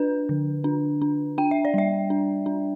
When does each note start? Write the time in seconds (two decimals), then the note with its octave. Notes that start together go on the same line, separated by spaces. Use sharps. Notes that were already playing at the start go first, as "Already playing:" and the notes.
Already playing: D4 B4
0.29 D3
0.64 D4
1.02 D4
1.38 D4 G5
1.51 E5
1.65 D5
1.74 G3 E5
2.10 D4
2.46 D4